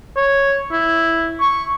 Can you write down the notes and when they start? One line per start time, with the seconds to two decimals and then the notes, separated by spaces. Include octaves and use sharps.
0.16 C#5
0.71 E4
1.40 C#6